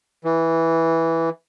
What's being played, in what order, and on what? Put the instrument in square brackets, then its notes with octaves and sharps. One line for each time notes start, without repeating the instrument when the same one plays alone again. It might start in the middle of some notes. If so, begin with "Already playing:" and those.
[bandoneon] E3